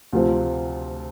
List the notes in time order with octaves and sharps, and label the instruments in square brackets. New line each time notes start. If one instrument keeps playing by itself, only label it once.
[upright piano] D2 C3 F3 C4